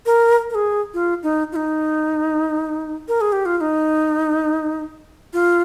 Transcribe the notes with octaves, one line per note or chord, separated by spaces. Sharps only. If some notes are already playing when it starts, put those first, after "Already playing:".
A#4
A#4
G#4
F4
D#4
F4
D#4
A#4
G#4
G4
F4
F4
D#4
F4